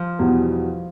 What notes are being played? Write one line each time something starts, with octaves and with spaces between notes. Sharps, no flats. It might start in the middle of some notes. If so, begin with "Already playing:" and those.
Already playing: F3
E2 B2 G3